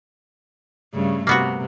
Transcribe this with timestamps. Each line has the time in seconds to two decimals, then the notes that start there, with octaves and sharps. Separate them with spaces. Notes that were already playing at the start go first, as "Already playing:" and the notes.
0.94 G2 C#3 A3
1.27 C3 A#3 B3 F#4